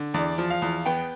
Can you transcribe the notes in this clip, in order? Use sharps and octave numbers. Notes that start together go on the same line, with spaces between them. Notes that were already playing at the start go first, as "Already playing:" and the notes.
Already playing: D3
E2 D5
F3
F5
E2
B3 G5